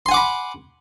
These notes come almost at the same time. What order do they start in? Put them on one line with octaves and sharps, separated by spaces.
C6 G#5 F#5 D6 B5